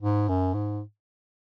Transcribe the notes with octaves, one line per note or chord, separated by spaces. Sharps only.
G#2
F#2
G#2